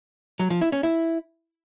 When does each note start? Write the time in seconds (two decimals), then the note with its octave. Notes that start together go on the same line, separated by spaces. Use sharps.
0.39 F#3
0.50 F3
0.61 E4
0.72 C#4
0.83 E4